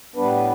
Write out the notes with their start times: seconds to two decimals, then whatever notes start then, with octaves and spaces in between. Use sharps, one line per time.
0.16 A2 G3 B3 D4 B4